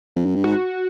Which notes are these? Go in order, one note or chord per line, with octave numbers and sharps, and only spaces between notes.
F2
F#2
G2
G#2 F#4